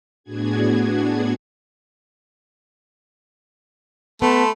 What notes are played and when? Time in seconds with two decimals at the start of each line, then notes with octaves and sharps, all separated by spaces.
0.24 A2 B3 D4 F#4 G#4 G#6
4.22 A3 B3 A5 B5 C6